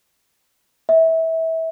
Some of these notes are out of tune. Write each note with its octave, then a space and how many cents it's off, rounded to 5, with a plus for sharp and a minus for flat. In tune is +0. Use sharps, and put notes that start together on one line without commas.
E5 -25